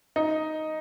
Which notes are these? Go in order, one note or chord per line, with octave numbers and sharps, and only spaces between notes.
D#4